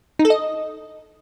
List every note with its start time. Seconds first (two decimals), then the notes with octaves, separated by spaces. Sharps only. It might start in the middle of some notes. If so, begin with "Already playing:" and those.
0.19 D#4
0.25 A4
0.30 D#5